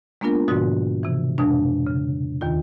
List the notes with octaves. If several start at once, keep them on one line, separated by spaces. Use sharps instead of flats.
G#3 A#3 B3 D4 F4 A#4
G#2 B2 D3 F3 F#4
C3 E3
F2 B2 G#3 D4
C#3
D#2 D#3 F4